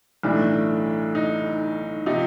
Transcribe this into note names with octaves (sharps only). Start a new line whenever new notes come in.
B1 A2 E3 A3 D4
D#4
C3 F3 D#4